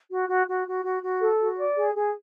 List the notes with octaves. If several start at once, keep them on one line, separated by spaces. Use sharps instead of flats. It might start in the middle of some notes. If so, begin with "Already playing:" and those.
F#4
F#4
F#4
F#4
F#4
F#4
A4
F#4
D5
G#4
G#4